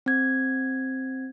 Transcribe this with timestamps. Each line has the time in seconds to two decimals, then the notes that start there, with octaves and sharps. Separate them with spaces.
0.06 C4 G#6